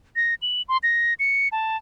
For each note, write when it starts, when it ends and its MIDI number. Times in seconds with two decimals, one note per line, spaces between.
0.16 0.34 94
0.42 0.62 102
0.69 0.77 84
0.83 1.14 94
1.19 1.48 97
1.52 1.77 81